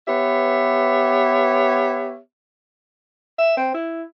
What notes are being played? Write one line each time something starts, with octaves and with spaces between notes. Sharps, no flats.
B3 G4 B4 C#5 E5
E5
C4
E4